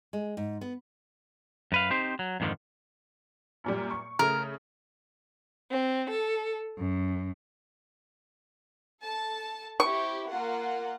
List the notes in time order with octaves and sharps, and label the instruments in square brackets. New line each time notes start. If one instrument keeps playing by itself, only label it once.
[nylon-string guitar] G#3
G#2
B3
[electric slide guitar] F#2 B4 F5
C4 D#4 G4 C5
F#3
F2 G#2 D3 D#3 F3
[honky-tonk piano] F#2 A#2 G3
C#6
[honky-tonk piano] C#3 A3 [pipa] A#4
[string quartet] C4
A4
F#2
[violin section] A4 A5
[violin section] C4 E4 G4 [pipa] C#6
[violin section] A#3 F4 F#5